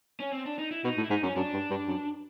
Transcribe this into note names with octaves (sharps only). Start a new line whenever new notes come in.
C#4
C4
D4
D#4
E4
B2 D#4
A2
E4
G#2 D#4
F#2 C#4
F#2 D4
G2
G2
F#2